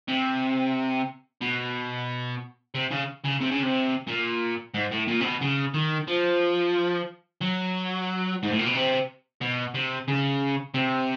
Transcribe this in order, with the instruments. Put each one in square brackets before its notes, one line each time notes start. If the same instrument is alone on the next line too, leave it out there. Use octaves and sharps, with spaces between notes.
[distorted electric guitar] C3
B2
C3
C#3
C#3
C3
C#3
C3
A#2
G#2
A2
A#2
C3
B2
C#3
D#3
F3
F#3
G#2
A2
A#2
B2
C3
B2
C3
C#3
C3